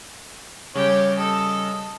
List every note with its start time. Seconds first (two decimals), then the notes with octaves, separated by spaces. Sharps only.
0.75 C#3 G3 G4 C#5
1.19 A4 D#5